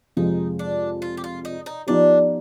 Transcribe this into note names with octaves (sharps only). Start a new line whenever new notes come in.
F2 C3 F3 G#3 D#4
D4
F4
G4
F4
D#4
D#4
F3 B3 D4 D#4 G4